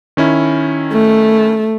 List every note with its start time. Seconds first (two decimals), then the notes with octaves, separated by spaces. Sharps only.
0.17 D#3 C#4 E4
0.93 A3